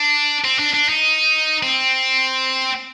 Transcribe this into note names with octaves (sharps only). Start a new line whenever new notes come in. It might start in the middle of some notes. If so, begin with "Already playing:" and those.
Already playing: D4
C4
D4
D4
D#4
C4